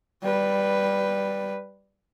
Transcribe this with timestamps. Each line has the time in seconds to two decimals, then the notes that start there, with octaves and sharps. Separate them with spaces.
0.22 G3 B4